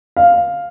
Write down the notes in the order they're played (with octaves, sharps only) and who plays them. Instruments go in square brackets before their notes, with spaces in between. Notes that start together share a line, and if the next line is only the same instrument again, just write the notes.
[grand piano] F5